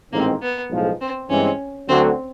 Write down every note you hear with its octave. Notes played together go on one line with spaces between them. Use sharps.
A1 G#2 D#3 G#3 A#3 C4
B3
B1 A2 F3 G#3
C4
G2 E3 G#3 C4 C#4
D2 D3 F#3 C4